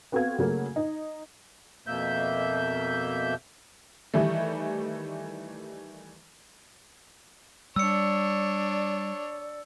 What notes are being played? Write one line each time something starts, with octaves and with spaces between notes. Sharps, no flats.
B3 C4 F#4 A4 F5 G#6
C#3 F#3 A3 A#3
D#4
F2 B2 A#3 E5 G6
D#3 E3 G3 A3
G3 D4 C#5 D5 E6 C#7